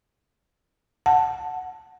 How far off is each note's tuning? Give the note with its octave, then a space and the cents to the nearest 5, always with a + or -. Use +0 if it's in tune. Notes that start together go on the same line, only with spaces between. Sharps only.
F#5 +0 A5 +0